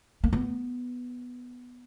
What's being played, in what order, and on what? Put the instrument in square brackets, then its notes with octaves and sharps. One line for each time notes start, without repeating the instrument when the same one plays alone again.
[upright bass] A#3
B3